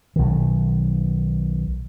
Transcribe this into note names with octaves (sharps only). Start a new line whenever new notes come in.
B1 D#3